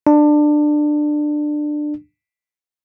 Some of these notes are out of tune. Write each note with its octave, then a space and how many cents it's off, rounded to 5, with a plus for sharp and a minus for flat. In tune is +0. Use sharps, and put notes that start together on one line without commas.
D4 +20